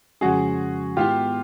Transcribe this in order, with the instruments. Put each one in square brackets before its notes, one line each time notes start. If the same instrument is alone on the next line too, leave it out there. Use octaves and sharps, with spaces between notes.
[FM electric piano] F2 C#3 F3 G#3 C#4 [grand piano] F#4 G#4
[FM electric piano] G#2 D#3 G#3 B3 E4 [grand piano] F4 G4